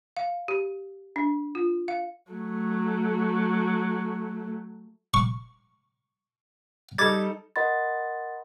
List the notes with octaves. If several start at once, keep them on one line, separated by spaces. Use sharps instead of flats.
F5
G4
D4
F4
F5
F#3 A3
C#6
G3 D#4 A4 D6 G#6 A6
A#4 D#5 F#5 B5 C6 A6